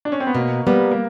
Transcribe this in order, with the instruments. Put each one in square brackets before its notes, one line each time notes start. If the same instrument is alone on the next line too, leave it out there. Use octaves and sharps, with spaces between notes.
[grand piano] D4
C#4
C4
B3
[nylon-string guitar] B2 [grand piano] A#3
[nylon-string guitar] G3 B3 [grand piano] A#3
[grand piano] A#3